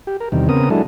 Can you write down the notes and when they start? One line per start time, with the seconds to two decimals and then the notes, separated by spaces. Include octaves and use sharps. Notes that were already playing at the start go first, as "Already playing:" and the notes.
0.07 G4
0.20 A#4
0.32 E2 C3 D#3 G3
0.49 C#3 B3 C4 A#4 D#6
0.70 F#3 G#3 D4 E4 A4